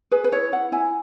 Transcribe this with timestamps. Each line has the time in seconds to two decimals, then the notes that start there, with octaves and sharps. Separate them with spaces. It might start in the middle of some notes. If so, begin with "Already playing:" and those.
0.12 G#4 B4
0.24 B4
0.32 E4 C#5
0.52 E4 F#5
0.72 E4 G#5